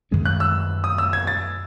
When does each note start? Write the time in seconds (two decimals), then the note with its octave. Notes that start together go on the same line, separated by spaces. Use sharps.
0.11 F#2 D#3 G#3 C#4
0.25 F#6
0.40 E6
0.84 D#6
0.98 E6
1.13 G#6
1.27 A6